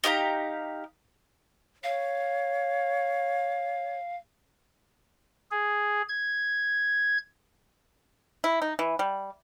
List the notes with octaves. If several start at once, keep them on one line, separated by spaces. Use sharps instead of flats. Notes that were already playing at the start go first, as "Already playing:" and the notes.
D#4 G4 F5 A#5
C#5 F5
G#4
G#6
E4
D#4
E3
G3